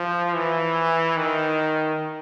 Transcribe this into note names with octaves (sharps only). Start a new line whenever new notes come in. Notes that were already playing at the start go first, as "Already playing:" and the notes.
Already playing: F3
E3
D#3